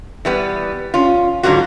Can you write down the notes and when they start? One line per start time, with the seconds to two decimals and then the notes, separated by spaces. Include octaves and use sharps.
0.25 E3 G3 B3
0.94 C#4 F4
1.43 G#2 D3 F#3 G3 F4 F#4